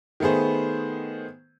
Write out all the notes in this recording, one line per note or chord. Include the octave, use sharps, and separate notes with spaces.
D#3 A3 B3 G#4 C5